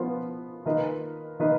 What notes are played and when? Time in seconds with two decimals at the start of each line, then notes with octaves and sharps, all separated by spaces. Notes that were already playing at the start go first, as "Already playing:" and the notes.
Already playing: F3 B3 F4 B4
0.66 D#3 A#3 F4 B4 D#5
1.40 D#3 A#3 F4 B4 D#5